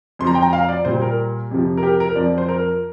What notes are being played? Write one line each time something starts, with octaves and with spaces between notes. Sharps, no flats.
F2 F3 C6
A#5
G5
A#5
F5
D5
A#2 G3 C5
A#4
F2 C3 F3
A#4
G4
A#4
F2 F3 D5
C5
A#4